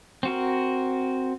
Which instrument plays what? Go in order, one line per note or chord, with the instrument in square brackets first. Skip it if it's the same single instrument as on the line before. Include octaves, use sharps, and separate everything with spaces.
[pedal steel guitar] C4 F#4 A#4